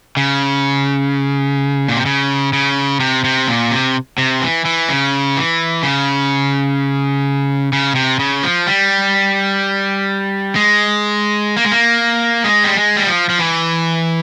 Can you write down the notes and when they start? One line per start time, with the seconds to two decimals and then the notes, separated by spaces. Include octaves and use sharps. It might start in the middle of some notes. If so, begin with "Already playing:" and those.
0.17 C#3
1.88 A#2
1.97 C3
2.06 C#3
2.53 C#3
3.00 C3
3.24 C3
3.48 A#2
3.71 C3
4.18 C3
4.42 E3
4.65 E3
4.89 C#3
5.36 E3
5.83 C#3
7.73 C#3
7.95 C3
8.19 C#3
8.43 F3
8.67 G3
10.55 G#3
11.57 A#3
11.65 G#3
11.71 A#3
12.44 G#3
12.64 G3
12.75 G#3
12.97 G3
13.06 F3
13.29 F3
13.39 E3